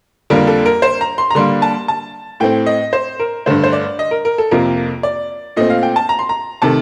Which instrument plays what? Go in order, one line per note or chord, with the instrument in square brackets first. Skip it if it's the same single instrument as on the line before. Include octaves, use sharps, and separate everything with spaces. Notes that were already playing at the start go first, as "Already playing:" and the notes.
[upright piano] F2 D3 G3 A#3 A#4
A4
A#4
C5
A#5
C6
A#5
D3 G3 A#3 C6
A5
A5
A2 A3 C4 G5
D#5
C5
A#4
G2 D3 A3 C5
C5
D5
D#5
A#4
A#4
A4
F2 C3 F3 A#3 A#4
D5
A#2 A3 C4 D#5
F5
G5
A5
A#5
C6
A#5
C3 D#3 A3 A5